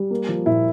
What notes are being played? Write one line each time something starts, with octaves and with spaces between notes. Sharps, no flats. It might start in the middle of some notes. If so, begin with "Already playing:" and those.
Already playing: G3
A#3
F3
A#2 E4